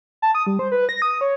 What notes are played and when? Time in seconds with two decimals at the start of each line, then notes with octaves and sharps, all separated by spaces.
0.22 A5
0.35 D#6
0.47 G3
0.59 C5
0.72 B4
0.89 A#6
1.02 D#6
1.21 C#5